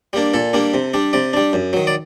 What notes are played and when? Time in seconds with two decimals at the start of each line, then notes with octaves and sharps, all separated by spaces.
0.13 G3 A#3 D4
0.34 A#2 A4
0.53 G3 A#3 D4
0.74 C3
0.94 G3 D4
1.13 C3 D5
1.33 G3 D4
1.53 F#2
1.73 D#3 F#3
1.87 D5